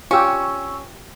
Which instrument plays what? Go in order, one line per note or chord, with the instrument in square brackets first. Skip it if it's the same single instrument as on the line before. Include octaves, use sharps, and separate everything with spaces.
[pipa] C#4 [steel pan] F4 G4 [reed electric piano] C#6 E6